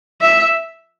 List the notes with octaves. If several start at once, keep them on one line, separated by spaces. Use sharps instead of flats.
E5